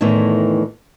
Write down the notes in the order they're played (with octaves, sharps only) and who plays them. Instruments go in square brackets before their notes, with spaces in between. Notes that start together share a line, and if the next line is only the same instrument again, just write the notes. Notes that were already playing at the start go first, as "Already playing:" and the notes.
[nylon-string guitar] E2 A2 D#3 E3 A3